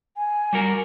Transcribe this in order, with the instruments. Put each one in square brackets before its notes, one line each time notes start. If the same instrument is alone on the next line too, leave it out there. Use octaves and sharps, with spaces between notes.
[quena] G#5
[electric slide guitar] G3 F#4 A#4